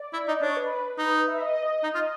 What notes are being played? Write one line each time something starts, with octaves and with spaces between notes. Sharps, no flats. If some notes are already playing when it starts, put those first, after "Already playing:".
Already playing: D5
E4 D5
D#4 D#5
D4 C#5
B4
D#4
E5
D#5
D#5
D#4
F4